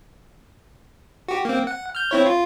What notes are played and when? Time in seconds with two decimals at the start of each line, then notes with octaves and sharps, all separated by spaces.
1.28 F#4 G4
1.45 A#3 C4
1.67 F#5
1.95 F6 G6
2.11 C4 E4 C#5
2.26 F4